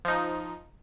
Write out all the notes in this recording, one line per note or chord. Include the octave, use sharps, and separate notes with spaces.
F3 D#4